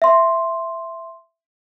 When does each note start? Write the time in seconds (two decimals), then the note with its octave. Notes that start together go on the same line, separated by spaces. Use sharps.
0.02 E5 C6